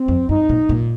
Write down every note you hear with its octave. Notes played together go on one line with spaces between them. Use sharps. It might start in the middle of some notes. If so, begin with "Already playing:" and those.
Already playing: C4
F2
G2 D#4
A#2
A#2